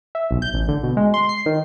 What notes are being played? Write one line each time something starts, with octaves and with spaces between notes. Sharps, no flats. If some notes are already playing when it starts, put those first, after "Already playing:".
E5
B1
G6
A1
D3
B2
G#3
C6
C7
D#3